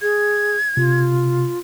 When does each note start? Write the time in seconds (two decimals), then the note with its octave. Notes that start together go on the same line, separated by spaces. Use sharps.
0.01 G#4 G#6
0.77 C3 F4